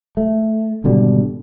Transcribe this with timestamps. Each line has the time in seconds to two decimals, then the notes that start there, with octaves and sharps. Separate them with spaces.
0.17 A3
0.84 G#1 B2 D3 G3